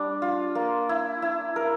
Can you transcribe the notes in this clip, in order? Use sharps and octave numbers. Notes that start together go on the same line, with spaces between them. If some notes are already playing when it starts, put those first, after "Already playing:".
Already playing: G3 D4
F4
A#3
E4
E4
A#4